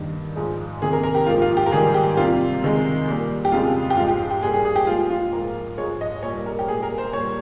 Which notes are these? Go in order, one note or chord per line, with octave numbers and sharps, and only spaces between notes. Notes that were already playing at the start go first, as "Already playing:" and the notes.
Already playing: G2 D#3 A#3
G#2 F3 G#3
C3 D#3 A#3 G#4
A#4
A#4
G4
G#2 F3 A#3 F4
F4
G4
A#4
G#2 D#3 G3 A#3 G#4
G4
C3 G3 A#3 F4
C3 D#3 G#3
A#2 G3 A#3
G4
F2 C#3 G#3 F4
G4
G#2 F3 G#3 F4
G4
G4
A#2 G3 A#3 G#4
G#4
G#4
G4
A#2 F3 G#3 F4
F4
G#2 F3 A#3 A#4
G#2 F3 G#3 C#5
D#5
A#2 G3 A#3 C#5
A#4
G4
A#2 G#3 G#4
A#4
C5
A#2 G3 A#3 C#5